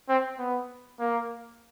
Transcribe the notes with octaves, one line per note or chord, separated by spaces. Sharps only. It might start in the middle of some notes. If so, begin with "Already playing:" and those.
C4
B3
A#3